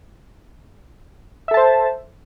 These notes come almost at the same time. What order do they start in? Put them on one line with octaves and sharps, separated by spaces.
E5 A4 A5 C5